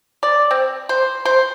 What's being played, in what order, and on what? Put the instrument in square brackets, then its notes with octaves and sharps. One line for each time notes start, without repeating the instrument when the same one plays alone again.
[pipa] D5
C4
C5
C5